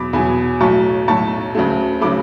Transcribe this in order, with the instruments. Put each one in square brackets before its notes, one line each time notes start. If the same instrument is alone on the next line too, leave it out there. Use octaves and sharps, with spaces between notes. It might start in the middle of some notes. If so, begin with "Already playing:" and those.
Already playing: [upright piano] E2 B2 F#3 B5 D6
E2 B2 F#3 G#5 B5
B1 A2 F#3 A5 C#6
B1 A2 F#3 A5 C#6
D2 C#3 F#3 A3
C#3 F#3 A3 B5 D6